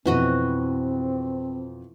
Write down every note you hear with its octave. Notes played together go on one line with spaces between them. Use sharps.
F2 B2 E3 C4 F#4 D#5